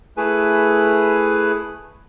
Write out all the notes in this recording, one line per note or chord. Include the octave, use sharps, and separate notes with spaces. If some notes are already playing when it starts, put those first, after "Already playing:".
A3 E4 G#4 B4 G#5